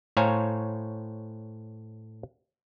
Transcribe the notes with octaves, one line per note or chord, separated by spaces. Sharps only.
A2 C5 C#5 F5 G#5 A#5